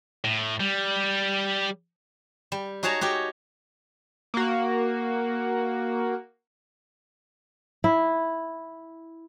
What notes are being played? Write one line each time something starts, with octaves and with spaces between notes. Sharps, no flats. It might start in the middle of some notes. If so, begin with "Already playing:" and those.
A2
G3
G3
D#4 F#4 G#4 C#5 A5 A#5
F#4 G4 C#5
A#3 F#4
E4